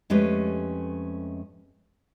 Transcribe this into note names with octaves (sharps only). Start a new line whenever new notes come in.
F2 G#3 A3 C#4 G4 B4